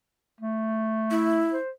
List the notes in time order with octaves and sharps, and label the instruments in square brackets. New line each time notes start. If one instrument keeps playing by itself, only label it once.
[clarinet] A3
[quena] E4
[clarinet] C5